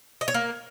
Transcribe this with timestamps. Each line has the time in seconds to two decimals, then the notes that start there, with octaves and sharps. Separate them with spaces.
0.21 D#5
0.28 C#5
0.34 A#3